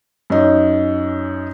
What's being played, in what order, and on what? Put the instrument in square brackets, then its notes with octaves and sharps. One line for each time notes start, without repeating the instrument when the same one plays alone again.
[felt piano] F#2 C#4 D#4